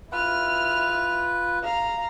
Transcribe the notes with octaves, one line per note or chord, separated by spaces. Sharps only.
E4 F4 B4 F6
F5 A#5